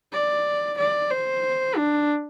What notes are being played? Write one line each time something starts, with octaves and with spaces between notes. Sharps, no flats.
D5
D5
C5
D4